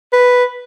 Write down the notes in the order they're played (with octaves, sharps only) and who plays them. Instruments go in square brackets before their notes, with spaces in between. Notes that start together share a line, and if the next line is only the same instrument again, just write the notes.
[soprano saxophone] B4